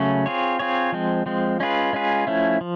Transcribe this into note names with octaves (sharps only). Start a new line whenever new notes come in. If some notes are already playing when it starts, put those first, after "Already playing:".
Already playing: C#3 F#3 A3 C#4
C4 F4 G#4 C#5
C4 F4 G#4 C#5
F3 G#3 C4
F3 G#3 C4
G#3 C#4 F4 G#4 B4
G#3 C#4 F4 G#4 B4
F3 A3 C#4 E4
F3